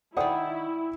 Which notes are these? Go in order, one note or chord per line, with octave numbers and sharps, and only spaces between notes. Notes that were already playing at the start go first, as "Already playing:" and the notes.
D#3 E4 D5 F#5 G5 D#6